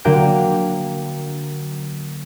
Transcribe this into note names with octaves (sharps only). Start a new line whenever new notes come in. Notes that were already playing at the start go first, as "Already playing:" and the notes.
D3 F#3 A#3 F5 G5 D7